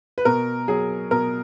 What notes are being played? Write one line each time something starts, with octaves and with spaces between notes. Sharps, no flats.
B4
B2 A#4
F#3 G#4
B2 A#4